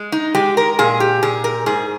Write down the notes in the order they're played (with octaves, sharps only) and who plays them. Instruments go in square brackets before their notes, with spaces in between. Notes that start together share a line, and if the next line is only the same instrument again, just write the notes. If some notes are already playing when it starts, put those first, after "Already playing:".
Already playing: [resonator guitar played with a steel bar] G#3
D#4
G#3 G4
A#4
A#2 G#4
G4
A#2 G#4
A#4
G#2 G#4